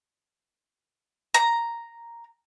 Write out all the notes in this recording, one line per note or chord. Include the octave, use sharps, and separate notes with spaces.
A#5